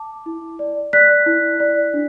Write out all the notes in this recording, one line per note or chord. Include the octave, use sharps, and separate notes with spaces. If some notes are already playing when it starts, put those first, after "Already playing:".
Already playing: A5 D6
E4
D5
D5 F#6 B6
E4
D5
D4